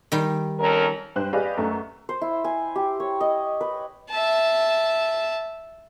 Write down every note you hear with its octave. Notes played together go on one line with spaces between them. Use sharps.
D#3 G3
F2 C#4 A#4
G2 B4 C5 G5 F#6
G4 G#4 B4 D5 D#5 F5
F#2 A3
C5
E4
G#5
G4
C#5
D#5
B4
E5 A5